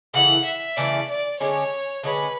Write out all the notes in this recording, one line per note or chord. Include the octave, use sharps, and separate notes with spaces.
C#3 E3 A3 E4 F#5
E5
C#3 E3 A3 E4 D5
D5
D3 G#3 C#4 C#5
D3 G#3 C#4 B4